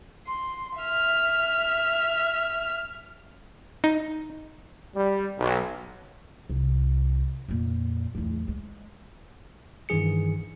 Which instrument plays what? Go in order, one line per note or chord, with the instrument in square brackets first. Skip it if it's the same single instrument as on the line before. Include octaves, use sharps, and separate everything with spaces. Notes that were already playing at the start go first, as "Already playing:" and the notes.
[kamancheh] C6
E5 F6
[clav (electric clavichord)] D#4
[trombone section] G3
B1
[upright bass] C2
F2 A#2
D1 E2
G#3
[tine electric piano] G2 D#3 E3 G#4 C#7